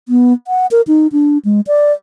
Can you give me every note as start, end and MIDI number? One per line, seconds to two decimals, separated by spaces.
0.09 0.33 59
0.47 0.66 78
0.71 0.82 70
0.87 1.07 63
1.12 1.38 62
1.45 1.61 56
1.67 1.92 74